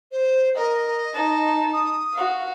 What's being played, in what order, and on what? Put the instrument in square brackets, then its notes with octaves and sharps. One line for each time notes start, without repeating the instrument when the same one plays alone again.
[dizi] C5
[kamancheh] A#4 [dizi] D#5
[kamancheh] D#4 A5
[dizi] D#6
[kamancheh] F#4 F5